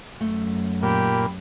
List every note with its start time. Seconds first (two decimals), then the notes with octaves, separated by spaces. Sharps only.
0.21 F#2 A3
0.82 A#2 G4 B5